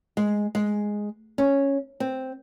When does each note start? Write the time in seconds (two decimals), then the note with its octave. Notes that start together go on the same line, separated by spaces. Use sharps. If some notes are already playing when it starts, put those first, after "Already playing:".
0.17 G#3
0.55 G#3
1.38 C#4
2.00 C4